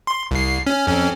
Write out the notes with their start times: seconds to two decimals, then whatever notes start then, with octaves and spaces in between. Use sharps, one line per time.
0.07 C6
0.31 C2 C7
0.67 C#4
0.87 F2 C#4